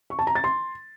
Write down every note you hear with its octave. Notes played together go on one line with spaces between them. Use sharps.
C#6
A5
A#5
A6
C6